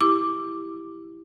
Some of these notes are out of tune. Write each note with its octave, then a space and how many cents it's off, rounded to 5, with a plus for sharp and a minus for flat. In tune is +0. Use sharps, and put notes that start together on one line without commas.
E4 +0 G4 +0 D6 +0